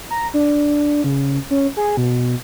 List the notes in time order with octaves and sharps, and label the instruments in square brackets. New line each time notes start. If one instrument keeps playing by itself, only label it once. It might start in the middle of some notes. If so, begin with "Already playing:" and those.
[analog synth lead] A#5
D4
C#3
C#4
G#4
B2